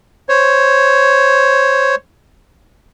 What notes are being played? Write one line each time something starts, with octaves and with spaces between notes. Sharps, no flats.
C5 C#5